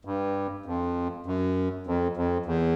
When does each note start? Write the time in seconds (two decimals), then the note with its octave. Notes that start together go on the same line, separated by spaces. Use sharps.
0.05 G2
0.66 F2
1.26 F#2
1.87 F2
2.17 F2
2.46 E2